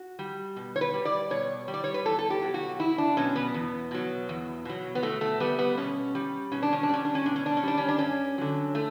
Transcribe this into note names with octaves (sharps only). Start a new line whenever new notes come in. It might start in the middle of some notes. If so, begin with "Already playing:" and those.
Already playing: F#4
G3
B2
C#5
B4
G3
D5
B2 C#5
G3
D5
C#5
B4
E2 A4
A4
G4
B2 F#3
F#4
E2 E4
D4
B2 F#3 C#4
B3
E2
B2 F#3
E2
B2 F#3
B3
B2 A3
A3
G3 B3
B3
B2 C#4
G3
B2 C#4
D4
C#4
D4
G3 C#4
D4
C#4
B2 D4
C#4
D4
C#4
G3 D4
C#4
D4
G2 C#4
D3 F#3
A3